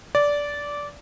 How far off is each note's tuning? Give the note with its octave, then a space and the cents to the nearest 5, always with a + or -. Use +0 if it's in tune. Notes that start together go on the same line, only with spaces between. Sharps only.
D5 -15